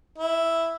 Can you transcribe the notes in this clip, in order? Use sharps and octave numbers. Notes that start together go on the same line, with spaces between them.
E4